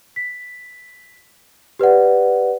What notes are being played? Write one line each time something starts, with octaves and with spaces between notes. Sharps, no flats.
B6
G4 B4 D5 F#5